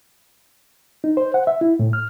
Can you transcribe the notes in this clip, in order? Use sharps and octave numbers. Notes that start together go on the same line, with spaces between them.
D#4
C5
F#5
E5
E4
A2
F6